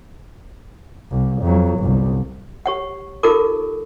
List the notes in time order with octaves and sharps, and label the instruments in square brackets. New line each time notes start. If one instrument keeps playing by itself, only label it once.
[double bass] C2
F2 F#3
G1 C2
[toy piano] G4 C#5 F#5
D#4 F4 G4 A4 A#4 D6